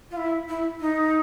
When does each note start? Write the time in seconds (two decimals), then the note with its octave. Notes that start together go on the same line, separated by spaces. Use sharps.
0.11 F4
0.17 E4
0.49 E4
0.80 D#4